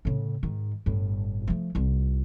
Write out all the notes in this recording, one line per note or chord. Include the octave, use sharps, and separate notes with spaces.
A2 C#3
G#2 D#3
G1 A2
F3 A3
C2 F4